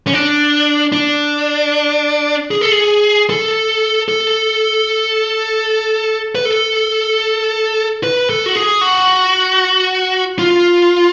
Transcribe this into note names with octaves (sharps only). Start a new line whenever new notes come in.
C#4
D4
D4
G#4
A4
G#4
A4
A4
B4
A4
B4
A4
F#4
G#4
F#4
F4